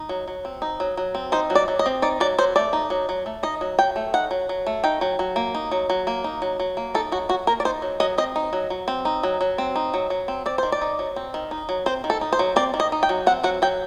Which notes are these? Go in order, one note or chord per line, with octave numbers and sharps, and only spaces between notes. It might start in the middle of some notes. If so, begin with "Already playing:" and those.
Already playing: D#4
F#3
F#3
C4
D#4
F#3
F#3
C4
D#4 C5
F#3
D5
F#3
D#5
C4
D#4 D5
F#3 D5
F#3 C5
A3 D5
D#4
F#3
F#3
A3
D#4 D#5
F#3
F#3 G5
A3
D#4 F#5
F#3
F#3
A3
D#4 G5
F#3
F#3
A#3
D#4
F#3
F#3
A#3
D#4
F#3
F#3
A#3
D#4 A4
F#3 F#4
F#3 F#4
A#3 A#4
D5
D#4 C5
F#3
F#3 D#5
C4 D#5
D#4
F#3
F#3
C4
D#4
F#3
F#3
C4
D#4
F#3
F#3
C4
C4 D5
D#3 C5
D5
D#4
F#3
C4
D#3
D#4
F#3
C4 C5
D#3
A4
D#4
C5
F#3
C4 D5
D#3
D#5
D#4
G5
F#3
C4 F#5
F#3 F#5
F#3 G5